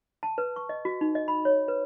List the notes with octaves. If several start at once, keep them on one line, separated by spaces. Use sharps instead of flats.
A5
B4
C#6
D#5
F#4
D#4
D#5
B5
C#5
B4